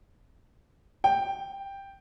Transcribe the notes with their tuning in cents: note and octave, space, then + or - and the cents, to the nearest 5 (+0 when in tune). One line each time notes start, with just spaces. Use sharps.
G5 +5